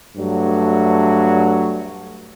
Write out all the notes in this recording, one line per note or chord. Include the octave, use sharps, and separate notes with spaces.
G2 F#3 A3